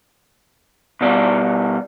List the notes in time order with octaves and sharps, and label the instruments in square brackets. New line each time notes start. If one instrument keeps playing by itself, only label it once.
[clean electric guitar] B2 G3 D5